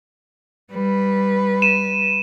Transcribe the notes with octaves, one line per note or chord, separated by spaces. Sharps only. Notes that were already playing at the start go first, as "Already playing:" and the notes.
G3 B4
D#7 E7